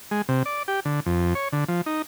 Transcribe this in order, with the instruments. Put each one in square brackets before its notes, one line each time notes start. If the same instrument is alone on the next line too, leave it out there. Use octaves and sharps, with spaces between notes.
[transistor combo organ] G#3
C3
D5
G4
D3
F2
C#5
D3
F3
D#4